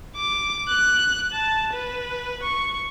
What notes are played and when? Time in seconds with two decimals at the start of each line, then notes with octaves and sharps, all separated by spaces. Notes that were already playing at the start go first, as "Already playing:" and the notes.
0.16 D6
0.68 F#6
1.33 A5
1.73 B4
2.43 C#6